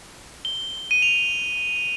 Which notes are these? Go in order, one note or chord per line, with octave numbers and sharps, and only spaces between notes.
G7
D#7
F7